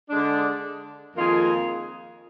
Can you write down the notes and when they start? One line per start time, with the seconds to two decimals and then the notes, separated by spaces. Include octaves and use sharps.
0.10 D3 G#3 D4
1.16 F2 D#3 A#3 F4 G#4